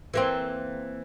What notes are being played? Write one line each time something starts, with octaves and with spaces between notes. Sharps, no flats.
E3 A#3 C4